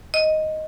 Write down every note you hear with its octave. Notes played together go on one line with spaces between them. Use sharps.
D#5